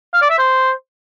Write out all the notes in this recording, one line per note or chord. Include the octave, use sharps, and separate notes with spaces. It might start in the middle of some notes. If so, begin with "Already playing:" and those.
F5
D5
E5
C5